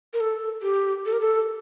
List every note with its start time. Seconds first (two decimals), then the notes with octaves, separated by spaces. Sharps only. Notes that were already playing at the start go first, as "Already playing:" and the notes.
0.14 A#4
0.20 A4
0.62 G4
1.06 A4
1.13 A#4
1.21 A4